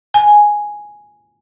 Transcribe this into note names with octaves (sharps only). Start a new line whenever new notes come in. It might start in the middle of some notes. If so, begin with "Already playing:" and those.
G#5